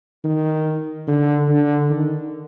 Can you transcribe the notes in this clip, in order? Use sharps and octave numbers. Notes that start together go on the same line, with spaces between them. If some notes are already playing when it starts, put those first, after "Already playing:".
D#3
D3
D3
D#3